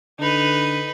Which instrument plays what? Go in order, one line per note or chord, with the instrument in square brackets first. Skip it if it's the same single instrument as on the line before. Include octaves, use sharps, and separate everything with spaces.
[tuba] D3 [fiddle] D#4 B4